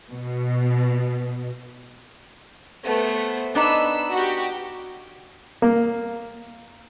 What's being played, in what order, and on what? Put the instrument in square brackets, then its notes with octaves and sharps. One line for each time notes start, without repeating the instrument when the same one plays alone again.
[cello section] B2
[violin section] A3 B3 C5
[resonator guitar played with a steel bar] B3 D4 D#4 [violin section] B5 E6
[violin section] F#4 G4
[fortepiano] A#3